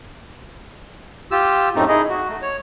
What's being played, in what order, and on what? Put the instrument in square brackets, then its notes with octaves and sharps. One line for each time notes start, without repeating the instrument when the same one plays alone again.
[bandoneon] F4 G4 E6
F#2 A2 A3 C4 D#4
D#4 E4 G#4 D#5
F#4
A3
C#5